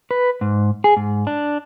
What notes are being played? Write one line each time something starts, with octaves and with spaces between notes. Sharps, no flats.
B4
G#2
G#4
G#2
D4